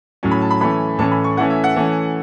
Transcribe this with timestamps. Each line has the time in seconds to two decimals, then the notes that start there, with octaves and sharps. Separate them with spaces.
0.23 A2 F#3 C#4
0.31 B5
0.42 A5
0.51 B5
0.61 E3 A3 C#4 B5
0.99 A2 E3 A3 C#4 A5
1.12 B5
1.24 C#6
1.37 E3 A3 C#4 F#5
1.50 E5
1.64 F#5
1.76 E3 A3 C#4